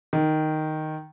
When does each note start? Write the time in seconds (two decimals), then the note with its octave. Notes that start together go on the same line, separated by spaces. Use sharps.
0.13 D#3